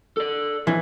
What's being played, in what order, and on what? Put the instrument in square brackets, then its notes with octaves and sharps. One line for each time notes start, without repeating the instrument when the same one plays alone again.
[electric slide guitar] A4 D5
[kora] E3 [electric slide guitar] F3 C#4